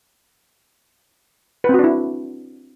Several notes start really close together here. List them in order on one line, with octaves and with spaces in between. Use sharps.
B4 C4 F#4 D4 E4